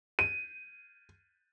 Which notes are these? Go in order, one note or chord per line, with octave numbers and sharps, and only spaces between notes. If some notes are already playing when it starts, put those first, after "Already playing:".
D#7